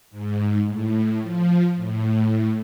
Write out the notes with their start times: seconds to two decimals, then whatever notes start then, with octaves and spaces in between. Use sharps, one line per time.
0.11 G#2
0.67 A2
1.21 F3
1.75 A2